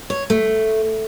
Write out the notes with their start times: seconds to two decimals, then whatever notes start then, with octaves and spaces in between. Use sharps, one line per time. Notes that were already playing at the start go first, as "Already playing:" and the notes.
0.10 C#5
0.30 A3